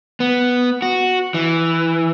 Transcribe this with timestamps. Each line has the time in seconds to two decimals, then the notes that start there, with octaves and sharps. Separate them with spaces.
0.20 B3
0.82 F#4
1.34 E3